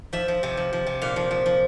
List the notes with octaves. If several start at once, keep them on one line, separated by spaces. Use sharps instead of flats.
F3 E5
F3
C3
F3
F3
C3
A#2 F5
F3
F3
F3